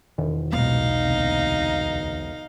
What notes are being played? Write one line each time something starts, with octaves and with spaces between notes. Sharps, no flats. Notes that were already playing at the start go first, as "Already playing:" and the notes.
E1 D#3
D1 B1 A#2 G#3 B3 D#4 F5
D2 C3